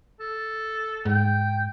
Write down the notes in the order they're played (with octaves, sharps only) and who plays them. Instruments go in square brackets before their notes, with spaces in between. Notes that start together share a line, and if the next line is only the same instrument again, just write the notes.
[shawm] A4
[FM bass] G#2 [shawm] G5